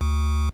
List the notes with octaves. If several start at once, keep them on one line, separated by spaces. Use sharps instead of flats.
D2